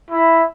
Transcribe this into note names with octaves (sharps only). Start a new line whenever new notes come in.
E4